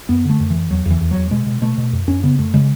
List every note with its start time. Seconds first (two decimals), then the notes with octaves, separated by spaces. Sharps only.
0.09 F#2 B3
0.25 D3 A3
0.40 F#2
0.50 F#2 E3
0.70 E2 F#3
0.86 E2 E3
1.01 E2
1.11 E2 F#3
1.31 B2 G#3
1.46 B2
1.62 B2 A3
1.78 B2
1.93 F#2
2.08 F#2 C#4
2.23 C#3 B3
2.38 F#2 A3
2.54 C#3 G#3